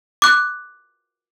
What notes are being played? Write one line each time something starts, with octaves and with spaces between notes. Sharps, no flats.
D6 F#6